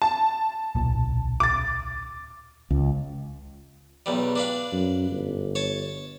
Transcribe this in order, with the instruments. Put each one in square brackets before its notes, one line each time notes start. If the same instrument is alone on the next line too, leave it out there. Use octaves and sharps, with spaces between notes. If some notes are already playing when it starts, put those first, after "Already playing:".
[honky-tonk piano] A5
[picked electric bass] D1 B1 A#2
[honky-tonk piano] D6 A6
[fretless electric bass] C#2
[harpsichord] B1 E2 G3
D4 B4 F5
[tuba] F#2
G1
[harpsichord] C#5 A5